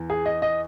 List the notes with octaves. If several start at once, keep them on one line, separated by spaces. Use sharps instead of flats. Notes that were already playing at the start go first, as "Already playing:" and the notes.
Already playing: E2
G#4
D#5
D#5